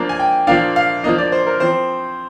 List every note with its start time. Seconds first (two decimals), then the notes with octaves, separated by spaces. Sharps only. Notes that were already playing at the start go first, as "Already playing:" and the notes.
Already playing: F3 A#3 D4
0.09 G#5
0.19 G5
0.47 A#2 F3 A#3 D4 F5
0.76 F5
1.03 F3 A#3 D4 D#5
1.18 D5
1.32 C5
1.47 A#4
1.60 F3 C4 C5